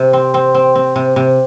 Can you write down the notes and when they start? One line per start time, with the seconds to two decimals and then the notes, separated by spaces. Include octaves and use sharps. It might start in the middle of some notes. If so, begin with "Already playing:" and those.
Already playing: C3
0.13 C4
0.34 C4
0.55 C4
0.75 C4
0.96 C3
1.16 C3